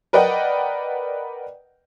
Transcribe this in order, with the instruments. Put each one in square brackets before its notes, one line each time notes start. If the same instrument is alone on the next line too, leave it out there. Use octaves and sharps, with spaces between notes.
[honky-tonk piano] A#4 B4 D5 D#5 F#5 G5